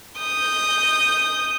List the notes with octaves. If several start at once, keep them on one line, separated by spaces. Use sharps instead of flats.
D#6 G6